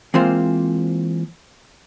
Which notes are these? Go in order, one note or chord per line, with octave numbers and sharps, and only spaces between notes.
E3 G#3 A#3 C4 F4 C5